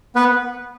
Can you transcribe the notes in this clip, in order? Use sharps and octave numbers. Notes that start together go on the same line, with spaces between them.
B3 B4